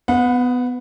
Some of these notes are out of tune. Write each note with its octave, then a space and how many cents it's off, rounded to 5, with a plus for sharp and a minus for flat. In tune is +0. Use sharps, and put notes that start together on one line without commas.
B3 +15 F#5 -30